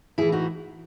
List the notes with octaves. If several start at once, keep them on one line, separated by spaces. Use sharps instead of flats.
A2 E3 E4 G#4
D#4 F#4